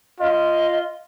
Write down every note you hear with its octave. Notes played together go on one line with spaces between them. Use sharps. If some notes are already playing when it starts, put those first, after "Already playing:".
F4 D#5